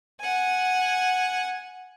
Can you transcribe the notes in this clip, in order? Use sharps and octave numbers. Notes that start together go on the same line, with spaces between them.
F#5 G#5